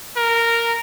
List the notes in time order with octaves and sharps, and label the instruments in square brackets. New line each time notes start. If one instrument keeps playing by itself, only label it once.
[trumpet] A#4